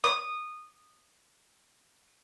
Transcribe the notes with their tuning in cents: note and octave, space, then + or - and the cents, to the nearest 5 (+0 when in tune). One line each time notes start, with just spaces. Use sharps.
D#6 -15